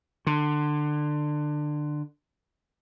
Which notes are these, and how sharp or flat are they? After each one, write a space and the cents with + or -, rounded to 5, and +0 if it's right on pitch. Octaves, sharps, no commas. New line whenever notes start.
D3 +20